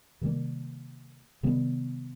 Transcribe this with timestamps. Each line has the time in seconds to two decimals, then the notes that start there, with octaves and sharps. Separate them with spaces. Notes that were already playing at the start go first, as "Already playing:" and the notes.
0.21 C3 D#3 G3 A#3
1.43 C3 D#3 G3 B3